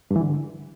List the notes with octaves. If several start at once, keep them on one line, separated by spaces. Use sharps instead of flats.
G2
E3
D3